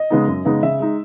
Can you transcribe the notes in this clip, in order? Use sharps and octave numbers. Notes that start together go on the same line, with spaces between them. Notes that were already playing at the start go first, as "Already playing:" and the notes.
Already playing: D#5
C#3 G#3 B3 D#4
F#2
C#3 G#3 B3 D#4
C#3 E5
G#3 D#4